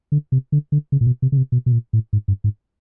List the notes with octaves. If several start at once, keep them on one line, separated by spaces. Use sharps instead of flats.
D3
C3
D3
D3
C#3
A#2
B2
C3
C#3
C3
B2
B2
A#2
A2
G#2
G2
G#2